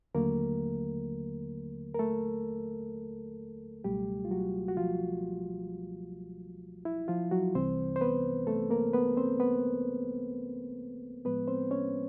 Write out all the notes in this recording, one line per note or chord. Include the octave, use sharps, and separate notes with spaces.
D#2 D3 F#3 A3 A#3 A#4
A#4
A3 A4
C#2 B2 F#3 G3 A3 G4
F4
F#3 F#4
F#4
F3 F4
E4
F3 F4
F#3 F#4
C2 C3 E3 G3 C4 C5
C5
B3 B4
A3 A4
A#3 A#4
B3 B4
C4 C5
B3 B4
A2 F3 G#3 B3 B4
C4 C5
C#4 C#5